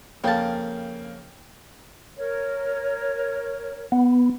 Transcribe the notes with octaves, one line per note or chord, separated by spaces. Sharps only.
F2 C#3 A#3 G5 A5
A#4 C#5
B3